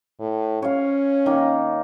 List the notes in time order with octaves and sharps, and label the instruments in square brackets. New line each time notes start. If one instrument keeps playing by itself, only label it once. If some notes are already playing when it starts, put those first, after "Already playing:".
[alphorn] A2
[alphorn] C#4 [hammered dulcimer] C#5 F5
[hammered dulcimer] D#3 A#3 D#4